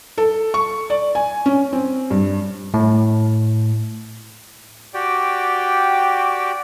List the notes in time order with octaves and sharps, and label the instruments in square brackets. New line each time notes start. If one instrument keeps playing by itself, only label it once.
[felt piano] A4
C#6
D5
G#5
C#4
C4
G2
[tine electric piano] A2
[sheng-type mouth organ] F#4 G4 D5 G5